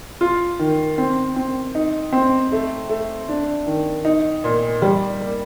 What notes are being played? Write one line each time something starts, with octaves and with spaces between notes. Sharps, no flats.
F4
D#3
C4
C4
D#4
C4
A3
A3
D4
D#3
D#4
A#2
G3
A#3